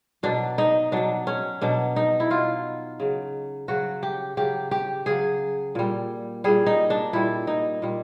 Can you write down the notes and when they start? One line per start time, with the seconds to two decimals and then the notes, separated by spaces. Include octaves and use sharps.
0.23 B2 F#3 D4
0.58 D#4
0.92 B2 F#3 D4
1.27 C#4
1.61 B2 F#3 D4
1.96 D#4
2.20 E4
2.30 B2 F#3 F4
3.00 C#3 F#3
3.68 C#3 F#3 F#4
4.03 G4
4.37 C#3 F#3 G4
4.71 G4
5.06 C#3 F#3 G#4
5.75 A#2 G3
6.44 A#2 G3 G#4
6.66 D#4
6.90 D4
7.13 A#2 G3 E4
7.47 D#4
7.82 A#2 G3